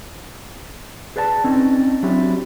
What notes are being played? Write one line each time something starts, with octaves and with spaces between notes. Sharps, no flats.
G#4 B4 D5 G#5 A5
C4 C#4 D#4 D5
F#3 C4 D4 E4 F#4 G4